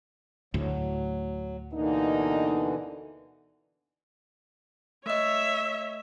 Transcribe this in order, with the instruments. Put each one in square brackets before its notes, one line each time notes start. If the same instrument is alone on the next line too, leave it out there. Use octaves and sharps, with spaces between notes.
[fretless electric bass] D2 A2 [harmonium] F#3
[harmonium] B2 D3 E3 [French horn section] A#3 D4 D#4
[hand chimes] A3 D#5 [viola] C#5 E5